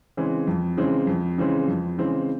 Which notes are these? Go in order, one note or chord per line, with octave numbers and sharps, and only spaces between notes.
C#3 E3 G#3 C4
F2
C#3 E3 G#3 C4
F2
C#3 E3 G#3 C4
F2
C#3 E3 G#3 C4